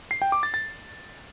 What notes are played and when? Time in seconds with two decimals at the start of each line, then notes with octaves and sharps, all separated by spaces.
0.11 C7
0.22 G5
0.32 D6
0.43 A6
0.54 A6